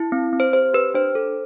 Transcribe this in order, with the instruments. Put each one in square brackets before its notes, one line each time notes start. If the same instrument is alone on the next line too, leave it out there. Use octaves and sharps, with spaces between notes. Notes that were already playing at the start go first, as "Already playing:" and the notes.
Already playing: [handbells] E4
C4
C4
C5
G4 C5
G4 B4
D4 C5
A4